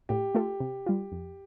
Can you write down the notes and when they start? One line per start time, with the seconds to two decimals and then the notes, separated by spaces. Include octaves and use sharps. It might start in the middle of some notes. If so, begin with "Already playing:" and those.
0.09 A2 G4
0.35 A3 F4 A4
0.60 C3
0.86 G3 F4
1.12 F2